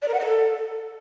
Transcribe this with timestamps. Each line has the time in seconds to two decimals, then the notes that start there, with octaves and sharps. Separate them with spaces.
0.02 D5
0.08 A#4
0.14 F#5
0.20 D#5
0.26 A4